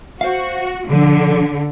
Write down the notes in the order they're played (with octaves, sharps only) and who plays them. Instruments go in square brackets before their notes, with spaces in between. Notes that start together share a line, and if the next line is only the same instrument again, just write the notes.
[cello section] F#4 [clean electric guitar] C5 F5
[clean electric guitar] B1 F3 [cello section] D3